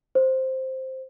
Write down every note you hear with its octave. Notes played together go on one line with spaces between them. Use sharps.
C5